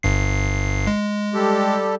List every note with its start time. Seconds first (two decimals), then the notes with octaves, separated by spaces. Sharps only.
0.03 G1 G2 C7
0.87 G#3
1.34 G3 G4 A4